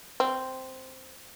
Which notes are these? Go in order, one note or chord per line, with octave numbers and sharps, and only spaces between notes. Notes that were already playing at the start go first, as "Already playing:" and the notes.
C4